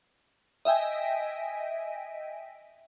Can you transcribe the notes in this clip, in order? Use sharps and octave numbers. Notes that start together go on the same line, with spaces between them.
D#5 E5 G5 G#5